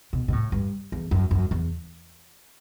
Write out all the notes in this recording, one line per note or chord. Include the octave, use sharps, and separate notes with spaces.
B2
B2
A2
G2
E2
F#2
F#2
E2